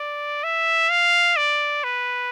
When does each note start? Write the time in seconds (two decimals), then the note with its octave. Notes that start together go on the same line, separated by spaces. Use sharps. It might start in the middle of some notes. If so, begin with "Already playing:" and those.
Already playing: D5
0.44 E5
0.90 F5
1.37 D5
1.84 B4